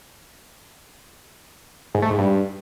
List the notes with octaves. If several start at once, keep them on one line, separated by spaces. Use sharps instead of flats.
G#2
A3
G#2
G2